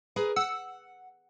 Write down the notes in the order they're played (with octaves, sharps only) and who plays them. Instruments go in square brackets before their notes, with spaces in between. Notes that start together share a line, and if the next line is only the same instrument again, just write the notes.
[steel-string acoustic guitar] G#4 A#4 B4
[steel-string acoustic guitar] F#5 [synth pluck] E6 C#7